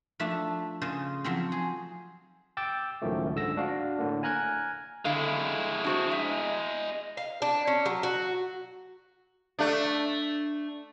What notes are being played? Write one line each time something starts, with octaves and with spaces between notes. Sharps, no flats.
F3 A3 D4 E5 A5
C#3 C5 D#5
F3 F#3 C4
G#4
G5 D6 E6 G6 A6
C#2 F#2 A2 D#3 F3 A3
G#2 D3 E6 A#6
D4 F#4 F5
A2 D3 A#3
G#5 A#5 F6 F#6 G#6
D3 G#3 E4 F5
D4 F#4 C5
E5
F5
D4
C#4
F#3
F#4
A3 D4